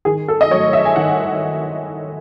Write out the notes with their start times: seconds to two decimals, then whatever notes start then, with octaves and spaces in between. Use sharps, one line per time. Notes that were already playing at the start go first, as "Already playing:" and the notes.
0.05 D#3 G#4
0.28 A4
0.41 D#5
0.50 F#3 C#5
0.54 A3
0.73 E5
0.85 G#5
0.96 D#3 F#5